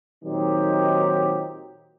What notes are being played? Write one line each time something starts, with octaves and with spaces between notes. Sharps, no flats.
A#2 D#3 F#3 C4 D#4 G4